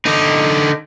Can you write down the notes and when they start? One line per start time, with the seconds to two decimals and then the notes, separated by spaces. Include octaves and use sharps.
0.06 D3 D#4